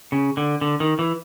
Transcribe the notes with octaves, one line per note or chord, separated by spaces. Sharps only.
C#3
D3
D3
D#3
E3